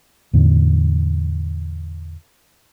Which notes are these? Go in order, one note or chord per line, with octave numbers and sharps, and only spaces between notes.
E2 A2 D3